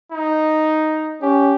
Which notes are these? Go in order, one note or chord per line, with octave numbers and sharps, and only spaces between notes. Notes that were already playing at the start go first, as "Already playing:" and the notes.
D#4
C#4 G4